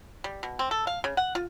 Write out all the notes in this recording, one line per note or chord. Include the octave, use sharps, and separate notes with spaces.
G3
B2
C4
A4
F5
C#3
F#5
F4